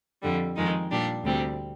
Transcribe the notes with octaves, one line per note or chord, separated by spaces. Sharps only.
F2 D3 G3
F2 D#3 G#3 D#4
A#2 G3 D4
D2 C3 G3 C4